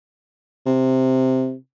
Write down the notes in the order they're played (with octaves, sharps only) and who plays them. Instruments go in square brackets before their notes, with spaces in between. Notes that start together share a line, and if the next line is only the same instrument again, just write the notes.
[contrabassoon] C3